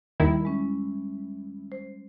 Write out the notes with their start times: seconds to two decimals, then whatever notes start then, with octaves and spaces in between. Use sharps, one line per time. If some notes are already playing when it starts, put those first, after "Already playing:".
0.20 D#2 D#3 G3 E4
0.45 G#3 C#4
1.72 C5